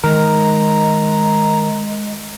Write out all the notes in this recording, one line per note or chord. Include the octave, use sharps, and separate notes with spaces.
D#3 G#3 A#4 A#5